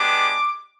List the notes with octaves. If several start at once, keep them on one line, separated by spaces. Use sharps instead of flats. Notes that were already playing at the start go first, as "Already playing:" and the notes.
Already playing: G#3 B3 D4 G4 D6